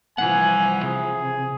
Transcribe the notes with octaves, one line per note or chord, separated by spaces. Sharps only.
C2 E3 F3 F#5 G#5
C3 G#4